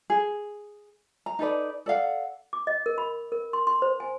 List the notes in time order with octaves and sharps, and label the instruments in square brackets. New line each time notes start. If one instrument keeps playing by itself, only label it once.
[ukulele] G#4
A#5
D#4 A4 B4 D5
A4 D5 F5 F#5
[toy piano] D6
D#5
A#4
B5
A#4
C6
C6
C5
G#5